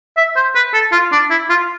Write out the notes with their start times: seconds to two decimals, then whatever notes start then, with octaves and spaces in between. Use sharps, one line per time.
0.17 E5
0.36 C5
0.55 B4
0.74 A4
0.92 F4
1.12 D4
1.30 E4
1.49 F4